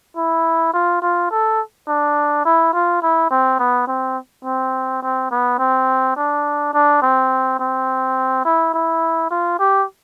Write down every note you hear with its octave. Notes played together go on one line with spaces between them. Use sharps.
E4
F4
F4
A4
D4
E4
F4
E4
C4
B3
C4
C4
C4
B3
C4
D4
D4
C4
C4
E4
E4
F4
G4